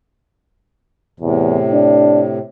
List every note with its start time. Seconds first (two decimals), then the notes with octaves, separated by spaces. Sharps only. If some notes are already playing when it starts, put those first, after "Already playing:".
1.20 E2 A2 C3
1.72 D4